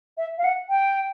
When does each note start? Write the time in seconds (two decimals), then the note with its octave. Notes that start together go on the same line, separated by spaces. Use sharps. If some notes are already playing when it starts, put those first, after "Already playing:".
0.17 E5
0.38 F5
0.44 F#5
0.69 G5